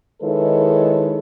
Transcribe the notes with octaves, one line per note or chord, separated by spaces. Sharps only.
D#3 G#3 E4 A4 B4 C#5